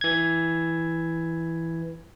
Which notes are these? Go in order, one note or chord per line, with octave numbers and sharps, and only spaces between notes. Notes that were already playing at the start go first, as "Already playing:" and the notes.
E3 G#6